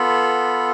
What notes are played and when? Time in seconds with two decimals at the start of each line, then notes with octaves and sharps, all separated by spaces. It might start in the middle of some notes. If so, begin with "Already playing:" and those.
Already playing: B3 F4 A4 B5